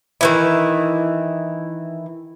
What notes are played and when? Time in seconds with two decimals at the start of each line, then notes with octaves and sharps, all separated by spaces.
0.21 D#3 E3 E4